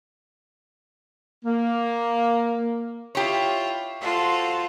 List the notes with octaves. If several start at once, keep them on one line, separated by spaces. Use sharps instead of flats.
A#3
E4 F4 G4 C#5
F4 F#4 A4 C5